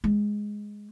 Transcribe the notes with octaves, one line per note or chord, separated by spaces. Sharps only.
G#3